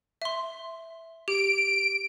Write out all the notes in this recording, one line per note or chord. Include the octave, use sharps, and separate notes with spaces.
E5 C6
G4 D7